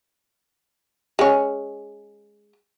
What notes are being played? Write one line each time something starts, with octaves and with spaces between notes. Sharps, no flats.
G#3 C#4